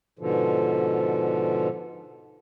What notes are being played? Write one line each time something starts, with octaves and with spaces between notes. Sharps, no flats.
G#2 B2 D3 F3